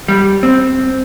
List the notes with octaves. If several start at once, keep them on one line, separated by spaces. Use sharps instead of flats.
G3
C4